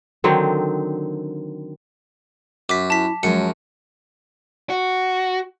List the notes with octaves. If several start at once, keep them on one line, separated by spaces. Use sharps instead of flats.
D3 D#3 F#3 C4
F#2 D6 B6
E4 A5 B6
F#2 F3 F#3 G#3 A#4 C#7
F#4